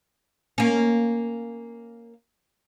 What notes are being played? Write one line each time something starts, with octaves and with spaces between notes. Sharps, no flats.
A#3 C#4